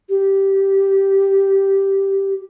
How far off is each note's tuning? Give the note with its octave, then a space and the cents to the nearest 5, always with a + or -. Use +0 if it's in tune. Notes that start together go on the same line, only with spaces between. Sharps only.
G4 -5